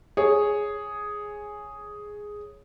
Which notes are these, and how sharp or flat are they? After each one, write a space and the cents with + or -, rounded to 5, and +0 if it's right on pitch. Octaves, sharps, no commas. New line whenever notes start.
G#4 +0 C#5 +0